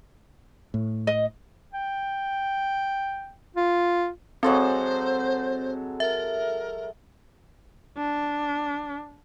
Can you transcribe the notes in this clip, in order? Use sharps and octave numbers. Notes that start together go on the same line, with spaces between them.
A2
D#5
G5
F4
F#3 G#3 C4 A4 C5
A#4 E5
D4